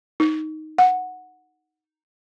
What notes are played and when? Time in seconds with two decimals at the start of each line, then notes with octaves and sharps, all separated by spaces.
0.20 D#4
0.78 F#5